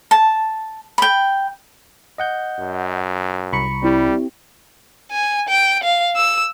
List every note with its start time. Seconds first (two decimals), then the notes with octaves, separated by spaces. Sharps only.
0.11 A5
0.98 G5 B5
2.18 D#5 F#5 G6
2.59 F#2
3.53 C2 A#5 B5 C#6 C#7
3.83 G3 C4 E4 G4
5.12 G#5
5.49 G5
5.84 F5
6.16 E6